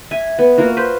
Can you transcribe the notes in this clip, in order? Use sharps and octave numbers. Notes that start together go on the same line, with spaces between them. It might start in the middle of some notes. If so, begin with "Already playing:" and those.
E5 G#5
B3
A#3 F4 F#4
B4 C5 C6